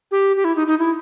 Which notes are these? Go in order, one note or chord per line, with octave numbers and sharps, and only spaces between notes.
G4
G4
E4
D#4
D#4
E4